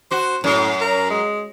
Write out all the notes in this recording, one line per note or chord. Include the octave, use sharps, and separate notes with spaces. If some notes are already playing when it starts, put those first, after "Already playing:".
F#4 C5
F#2 A2
A#4
G#3